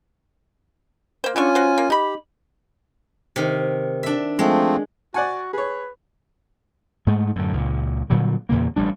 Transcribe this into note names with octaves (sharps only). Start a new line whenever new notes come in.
A#3 C5
D3 C#4 D4 F4 G#5 C#6
F#4 C5
A#3
D#4 G4 B5
C3 D#3
D4 E5
F3 G#3 A3 C4
F#4 D5 F#5 G#5
G#4 B4 C#5
G#2 G#3 A3
F#2 A2 D3
C#2 A#2
A#2 D3 F#3 G3
E2 A#2 C#3 A#3
A1 G3 D4